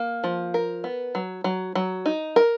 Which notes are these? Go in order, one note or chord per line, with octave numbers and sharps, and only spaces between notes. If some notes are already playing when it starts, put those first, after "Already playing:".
Already playing: A#3
F3
A#4
B3
F#3
F#3
F#3
D#4
A#4